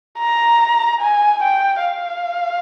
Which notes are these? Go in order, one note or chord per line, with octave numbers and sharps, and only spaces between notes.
A#5
G#5
G5
F5